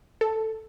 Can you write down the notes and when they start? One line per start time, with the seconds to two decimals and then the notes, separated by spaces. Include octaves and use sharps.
0.21 A4